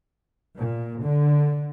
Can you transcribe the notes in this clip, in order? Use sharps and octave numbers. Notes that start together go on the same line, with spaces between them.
A#2
D3